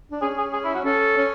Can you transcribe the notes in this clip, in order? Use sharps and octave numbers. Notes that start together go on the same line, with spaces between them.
D4
C#4 G#4
G#4
G#4
E4
F#4
C#4 A4
C#4